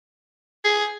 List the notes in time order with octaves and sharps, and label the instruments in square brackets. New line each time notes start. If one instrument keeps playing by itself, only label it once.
[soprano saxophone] G#4